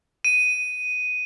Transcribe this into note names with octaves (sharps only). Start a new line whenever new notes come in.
D#7